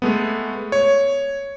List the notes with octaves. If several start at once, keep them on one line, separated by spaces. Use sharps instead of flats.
G#3 A3 B3
C#5